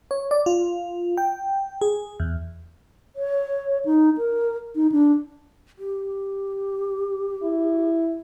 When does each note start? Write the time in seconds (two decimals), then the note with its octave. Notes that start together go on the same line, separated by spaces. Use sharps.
0.11 C#5
0.31 D5
0.46 F4
1.17 G5
1.81 G#4
2.20 E2
3.16 C#5
3.85 D#4
4.18 A#4
4.76 D#4
4.92 D4
5.79 G4
7.43 E4